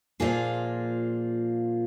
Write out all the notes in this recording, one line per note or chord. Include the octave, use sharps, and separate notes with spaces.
A#2 F3 A#3 F4 G#4